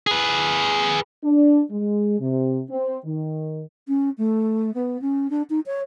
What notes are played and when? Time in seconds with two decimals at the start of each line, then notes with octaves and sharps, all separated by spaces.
0.07 G#4 B4
1.24 D4
1.71 G#3
2.21 C3
2.70 C4
3.05 D#3
3.88 C#4
4.18 A3
4.74 B3
5.02 C#4
5.30 D4
5.50 D#4
5.66 C#5